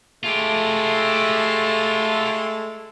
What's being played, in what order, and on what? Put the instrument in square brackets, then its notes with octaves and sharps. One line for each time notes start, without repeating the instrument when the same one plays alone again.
[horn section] G#3 A3 A4 [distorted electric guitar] F4 G4